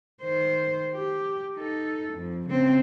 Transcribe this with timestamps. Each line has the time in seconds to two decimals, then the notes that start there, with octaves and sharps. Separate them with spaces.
0.22 D#3 C5
0.93 G4
1.56 D#4 A4
2.14 F2
2.49 C#3 C4